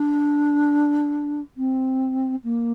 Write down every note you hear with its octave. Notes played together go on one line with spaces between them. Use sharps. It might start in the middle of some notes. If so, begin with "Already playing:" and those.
Already playing: D4
C4
A#3